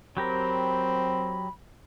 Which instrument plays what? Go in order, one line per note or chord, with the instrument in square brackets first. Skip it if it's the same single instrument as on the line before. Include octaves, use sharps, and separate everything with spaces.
[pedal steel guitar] F#3 G4 A#4 [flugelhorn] C4 [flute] B5